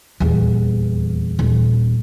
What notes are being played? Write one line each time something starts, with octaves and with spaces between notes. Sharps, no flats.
D#1 E2
D#1